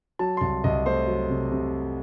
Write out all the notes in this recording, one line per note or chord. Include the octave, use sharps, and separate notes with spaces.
F#3 A5
C6
C2 A5
C2 D#5
A3 C5
F#3
C3
C3